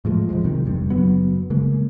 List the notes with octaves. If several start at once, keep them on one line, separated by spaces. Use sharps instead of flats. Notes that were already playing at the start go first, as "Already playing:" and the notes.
A2 F3 G#3
E1 C2 F3 G#3
B1 C3 D#3
F1 G2
F#1 F#3 B3
C#3 G#3 A#3